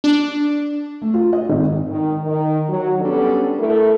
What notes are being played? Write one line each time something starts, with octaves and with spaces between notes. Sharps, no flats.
D4
A3
F4
D#5
G#1
D#3
D#3
F#3
G3 B3 C#4 D4 A4
A3 E4 A4 A#4